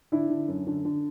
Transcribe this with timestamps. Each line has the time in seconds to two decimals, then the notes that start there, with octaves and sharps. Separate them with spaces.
0.12 D3 D4 E4
0.30 D3
0.48 F#2
0.67 D3
0.85 D3